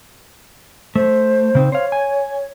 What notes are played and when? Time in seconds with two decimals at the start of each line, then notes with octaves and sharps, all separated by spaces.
0.96 A3 C5
1.55 C#3 C4 D#4
1.72 C5 C#5 F5
1.92 G#5